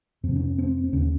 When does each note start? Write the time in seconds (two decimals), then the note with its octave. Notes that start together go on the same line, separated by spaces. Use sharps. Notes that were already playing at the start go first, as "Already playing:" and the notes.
0.23 F2 C3 C4
0.36 C#4
0.58 C4
0.84 C4
0.92 D#2 C#3 C#4